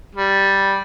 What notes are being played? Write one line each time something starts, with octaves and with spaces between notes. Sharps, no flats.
G3